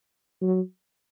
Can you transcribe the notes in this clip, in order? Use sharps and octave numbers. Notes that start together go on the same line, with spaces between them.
F#3